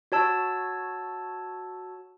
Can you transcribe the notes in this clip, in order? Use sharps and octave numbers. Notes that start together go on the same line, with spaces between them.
F#4 C#5 A5 E6